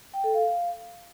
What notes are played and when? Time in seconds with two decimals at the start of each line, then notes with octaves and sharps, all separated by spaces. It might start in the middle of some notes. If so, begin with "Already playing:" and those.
0.14 G5
0.24 A4
0.34 F5